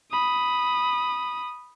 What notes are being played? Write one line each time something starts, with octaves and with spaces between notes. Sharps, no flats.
B5 D#6